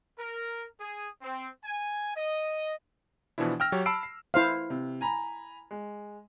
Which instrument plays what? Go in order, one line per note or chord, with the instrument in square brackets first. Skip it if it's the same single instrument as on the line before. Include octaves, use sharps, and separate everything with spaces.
[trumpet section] A#4
G#4
C4
G#5
D#5
[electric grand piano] B2 E3 F3 D4 E4
G5 E6 F6 A#6
F#3 G4 C#5
A5 B5 E6 C7 D7
C7
[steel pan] E4 C5 F5
[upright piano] C3
G#5 A#5 B5
G#3